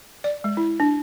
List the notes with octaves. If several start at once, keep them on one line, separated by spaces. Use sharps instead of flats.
D5
G#3
E4
D4